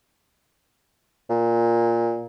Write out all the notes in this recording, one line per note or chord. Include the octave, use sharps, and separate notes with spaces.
A#2